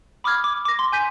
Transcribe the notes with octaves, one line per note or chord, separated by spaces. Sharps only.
B5 D6 D#6 F6 G#6
D6
D6 A#6
C6
G#5 G6 B6 D#7